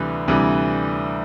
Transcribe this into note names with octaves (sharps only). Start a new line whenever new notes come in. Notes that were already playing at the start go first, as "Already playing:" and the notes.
Already playing: D2 C3 E3 G3 B4
D2 C3 E3 G3